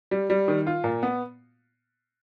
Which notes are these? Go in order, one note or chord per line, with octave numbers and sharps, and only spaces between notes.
G3
G3
D#3
F4
A#2
B3